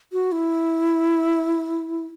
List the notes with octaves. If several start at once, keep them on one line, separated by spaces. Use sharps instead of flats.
F#4
E4